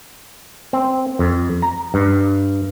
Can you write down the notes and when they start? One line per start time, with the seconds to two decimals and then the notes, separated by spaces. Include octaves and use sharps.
0.73 C4
1.19 F2
1.62 A#5
1.94 G2